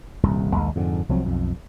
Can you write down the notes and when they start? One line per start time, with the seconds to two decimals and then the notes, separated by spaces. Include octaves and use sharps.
0.23 D#1 C2 G2
0.56 A#1 D#2 G#3
0.75 F2 G#2 D3
1.09 C2 F3 F#3 C4
1.25 B1 F2